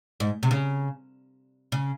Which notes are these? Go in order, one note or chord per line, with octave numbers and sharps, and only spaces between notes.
G#2
C3
C#3
C#3